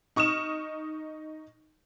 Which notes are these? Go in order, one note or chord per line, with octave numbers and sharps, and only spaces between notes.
D#4 C#6 D#6 F6 E7